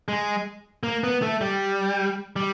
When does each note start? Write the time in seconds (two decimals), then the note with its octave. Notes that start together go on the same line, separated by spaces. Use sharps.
0.08 G#3
0.83 A#3
1.04 B3
1.22 A3
1.41 G3
2.36 G3